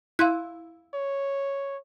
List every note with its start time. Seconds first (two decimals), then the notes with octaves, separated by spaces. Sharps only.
0.19 E4 F5 C6 F#6
0.94 C#5